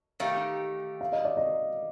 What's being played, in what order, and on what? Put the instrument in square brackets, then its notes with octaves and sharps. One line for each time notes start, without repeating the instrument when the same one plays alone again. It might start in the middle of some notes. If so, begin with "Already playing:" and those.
[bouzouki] D#3 A3 D#4 G4 [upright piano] F5
[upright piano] F5
D#5
D5
D#5